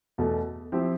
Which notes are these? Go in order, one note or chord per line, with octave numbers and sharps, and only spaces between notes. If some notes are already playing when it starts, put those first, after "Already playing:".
E2 B2 A3
F3 C4 E4 G4